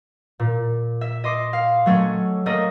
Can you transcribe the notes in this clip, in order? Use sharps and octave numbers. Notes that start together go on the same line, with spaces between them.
A#2
E5
D#5 C6 D6
F5
F#3 A3 C#4
A3 A#3 D#5